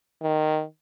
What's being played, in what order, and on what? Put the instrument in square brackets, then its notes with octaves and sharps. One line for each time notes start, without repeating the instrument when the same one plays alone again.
[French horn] D#3